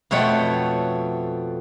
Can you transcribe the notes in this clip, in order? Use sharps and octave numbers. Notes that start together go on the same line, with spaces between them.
F2 B2 A3 C#5 F#5 G5